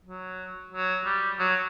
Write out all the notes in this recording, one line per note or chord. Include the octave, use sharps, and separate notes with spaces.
F#3
F#3
G3
F#3